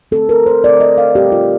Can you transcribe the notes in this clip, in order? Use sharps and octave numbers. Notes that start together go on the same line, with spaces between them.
D3 A3 C4 A4
A#4
C5
D3 A3 C4 D5
D#5
F5
A#2 A3 C4 G4
F4